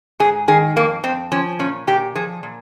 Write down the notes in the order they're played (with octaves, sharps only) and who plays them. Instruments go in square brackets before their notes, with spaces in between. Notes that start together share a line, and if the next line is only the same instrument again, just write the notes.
[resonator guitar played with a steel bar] G#2 G#4
D#3 G#4
F2 A#3
F2 C4
F3 C#4
A#2 C#4
A#2 G4
F3 G#4
A#2